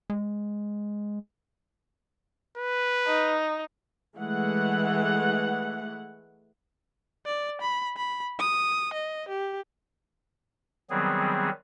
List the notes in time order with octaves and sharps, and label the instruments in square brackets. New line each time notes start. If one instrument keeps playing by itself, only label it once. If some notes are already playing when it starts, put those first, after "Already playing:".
[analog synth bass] G#3
[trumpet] B4
[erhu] D#4
[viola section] E3 G#3 A3 F#5
[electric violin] D5
B5
B5
D#6
D#5
G4
[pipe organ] D#3 F#3 G3 B3 C4 G#4